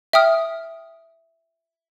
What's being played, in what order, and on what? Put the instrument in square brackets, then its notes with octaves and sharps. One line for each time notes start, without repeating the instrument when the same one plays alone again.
[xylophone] E5 G5 D#6 F6